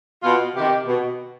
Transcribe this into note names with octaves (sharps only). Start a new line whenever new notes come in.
B2 F4
C3 D#3 G4
B2